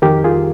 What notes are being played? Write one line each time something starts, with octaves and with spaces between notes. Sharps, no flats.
F2 D#3 G4 A#4
F4 G#4